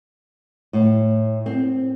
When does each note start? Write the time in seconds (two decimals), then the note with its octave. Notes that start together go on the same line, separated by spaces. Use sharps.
0.73 A2
1.46 C4